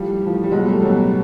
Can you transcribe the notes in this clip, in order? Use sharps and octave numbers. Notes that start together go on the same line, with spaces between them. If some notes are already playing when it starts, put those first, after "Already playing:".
Already playing: A2 F3 G3
A2
F3
G3
B2 F#3 G#3
G3 A3
B2 F#3